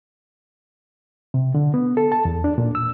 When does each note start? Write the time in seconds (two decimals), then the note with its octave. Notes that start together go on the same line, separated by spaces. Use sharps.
1.34 C3
1.55 D3
1.74 B3
1.97 A4
2.12 A5
2.25 E2
2.44 D4
2.58 A#2
2.75 E6